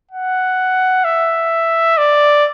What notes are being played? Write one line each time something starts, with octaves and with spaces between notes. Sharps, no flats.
F#5
E5
D5